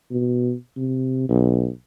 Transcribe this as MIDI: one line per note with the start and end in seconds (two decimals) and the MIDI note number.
0.11 0.53 47
0.77 1.28 48
1.29 1.69 35